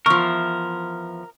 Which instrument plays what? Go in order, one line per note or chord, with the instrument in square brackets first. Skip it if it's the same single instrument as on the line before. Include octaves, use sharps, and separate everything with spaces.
[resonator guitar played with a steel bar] E2 F3 [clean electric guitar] A#4 [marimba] C#6